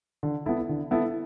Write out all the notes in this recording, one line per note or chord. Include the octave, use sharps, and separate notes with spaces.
D3
B3 E4 A4
D3
B3 E4 A4